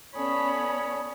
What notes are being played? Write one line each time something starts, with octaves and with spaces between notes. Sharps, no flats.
B3 C#4 A4 C#5 D5 G#5 B5 D#6